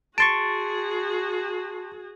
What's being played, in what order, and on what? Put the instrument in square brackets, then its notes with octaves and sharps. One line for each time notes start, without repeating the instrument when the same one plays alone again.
[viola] F#4 G#4 [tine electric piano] A5 C6 C#6 [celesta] A6 D7